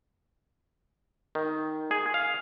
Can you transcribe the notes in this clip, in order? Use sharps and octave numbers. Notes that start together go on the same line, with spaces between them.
D#3
G#4
F5